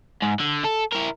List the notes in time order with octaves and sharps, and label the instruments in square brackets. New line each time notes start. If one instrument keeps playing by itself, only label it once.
[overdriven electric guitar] G#2
D3
A4
E4 A#4